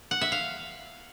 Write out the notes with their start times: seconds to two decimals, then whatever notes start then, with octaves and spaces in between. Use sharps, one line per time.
0.11 F#5
0.21 E5
0.32 F5